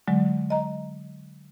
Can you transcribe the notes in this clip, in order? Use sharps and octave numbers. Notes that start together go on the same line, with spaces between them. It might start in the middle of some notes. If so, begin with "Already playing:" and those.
D3 F#3 G#3
D#5 A#5